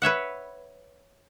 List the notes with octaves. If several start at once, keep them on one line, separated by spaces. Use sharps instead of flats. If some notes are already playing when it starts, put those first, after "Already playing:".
B4 C#5 E5 F#5